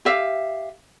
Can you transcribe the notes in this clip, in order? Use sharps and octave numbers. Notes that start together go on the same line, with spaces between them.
G4 E5 F5